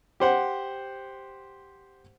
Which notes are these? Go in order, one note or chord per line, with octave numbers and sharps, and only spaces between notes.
G4 C5 F#5